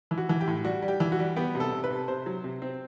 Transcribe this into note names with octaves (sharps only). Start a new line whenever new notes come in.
E3
F#4
E3
G4
A2
G3 F#4
G3
G4
E3
F#4
G3
B3 G4
C3
A4
C3
B4
C3
C3 C5
F#3
C3
C4